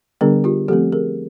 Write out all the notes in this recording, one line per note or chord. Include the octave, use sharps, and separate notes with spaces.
D3 G3 B3 D4 G#4 A#4
F4 G4
F3 A3 C4 G4 A4
G#4 A#4